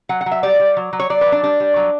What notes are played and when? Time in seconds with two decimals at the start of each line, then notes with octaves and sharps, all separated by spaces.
0.09 F#3 F#5
0.21 F#5
0.26 F#3
0.31 E5
0.43 G3 D5
0.60 G3
0.77 F#3
0.93 F#3
1.00 C#5
1.10 F#3 D5
1.21 F#3 B4
1.32 D4
1.43 G3 D4
1.60 G3
1.76 F#3